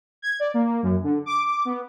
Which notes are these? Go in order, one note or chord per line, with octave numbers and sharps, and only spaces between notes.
G#6
D5
A#3
F#2
D3
D6
B3